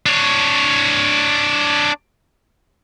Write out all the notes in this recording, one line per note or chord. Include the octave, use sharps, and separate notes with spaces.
D4 C#5